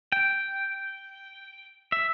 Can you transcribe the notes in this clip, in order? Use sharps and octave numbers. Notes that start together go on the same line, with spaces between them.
G5
E5